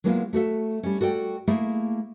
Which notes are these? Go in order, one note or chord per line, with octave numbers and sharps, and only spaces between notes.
F#3 G#3 A#3 B3 E4 F4
A3 F#4 A4 E5
G3 C#4
F#4 A4 D5 G5
A3 A#3 E4 G#4